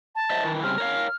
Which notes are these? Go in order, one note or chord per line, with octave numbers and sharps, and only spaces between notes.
A5
C5 D#5 E5
D#3 E3
C#3 G3 C4 F6
A#4 C#5 F5